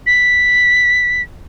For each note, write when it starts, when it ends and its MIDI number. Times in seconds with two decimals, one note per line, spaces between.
0.06 1.22 95